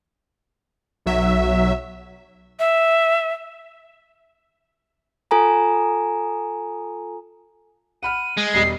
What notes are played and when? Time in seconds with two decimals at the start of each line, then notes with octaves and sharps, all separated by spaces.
1.06 B1 F#3 E5
2.59 E5
5.31 F4 A4 G#5 A#5
8.03 F#5 B5 F6 D#7
8.38 G#3
8.54 E1 G3 D#5 C7